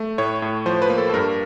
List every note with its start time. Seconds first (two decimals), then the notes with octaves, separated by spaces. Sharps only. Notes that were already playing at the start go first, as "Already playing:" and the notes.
Already playing: A3
0.18 A2 C#5
0.42 A2
0.66 F3 C5
0.82 B4
0.90 A#3
0.98 A4
1.09 A4
1.14 G2 A#4